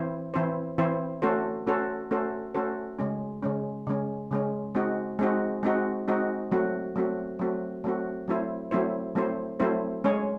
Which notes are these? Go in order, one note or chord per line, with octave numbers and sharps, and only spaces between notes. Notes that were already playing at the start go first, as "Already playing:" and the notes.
Already playing: E3 C4 E4 C5
E3 C4 E4 C5
E3 C4 E4 C5
A3 C#4 F#4 A4 C5
A3 C#4 F#4 A4 C5
A3 C#4 F#4 A4 C5
A3 C#4 F#4 A4 C5
C#3 G#3 C#4
C#3 G#3 C#4
C#3 G#3 C#4
C#3 G#3 C#4
G#3 C4 D#4 F#4
G#3 C4 D#4 F#4
G#3 C4 D#4 F#4
G#3 C4 D#4 F#4
F#3 A3 C4 F#4
F#3 A3 C4 F#4
F#3 A3 C4 F#4
F#3 A3 C4 F#4
F#3 A3 C4 E4 C5
F#3 A3 C4 E4 C5
F#3 A3 C4 E4 C5
F#3 A3 C4 E4 C5
G#3 C#4 G#4 C#5